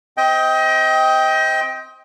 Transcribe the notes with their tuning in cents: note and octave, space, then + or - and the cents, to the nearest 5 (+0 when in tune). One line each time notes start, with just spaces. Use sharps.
C4 +0 D#5 +30 G5 +0